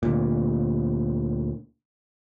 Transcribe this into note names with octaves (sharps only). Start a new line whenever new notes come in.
D2 A#2